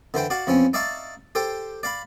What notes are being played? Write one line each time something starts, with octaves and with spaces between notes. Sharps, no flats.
D3 E3 C5 G5
F#4 D5 F5
E2 F3 C4 C#4
D#4 D5 E5 F5 A5 C#6
G4 A4 C5 G5
D5 F5 B5